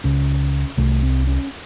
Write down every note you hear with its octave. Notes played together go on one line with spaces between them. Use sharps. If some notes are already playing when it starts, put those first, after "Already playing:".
C#2 C#3 C#4
C2 C3 A3
C4
C#4